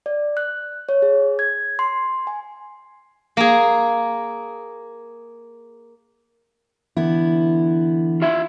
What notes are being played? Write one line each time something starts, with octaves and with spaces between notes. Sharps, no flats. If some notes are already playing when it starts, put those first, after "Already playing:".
D5
F#6
C#5
G#4
G#6
C6
G#5
A#3 G#4
D3 E3 B3 E4
F4 E5